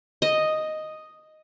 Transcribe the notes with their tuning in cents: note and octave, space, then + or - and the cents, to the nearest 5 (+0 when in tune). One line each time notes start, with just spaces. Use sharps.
D#5 +0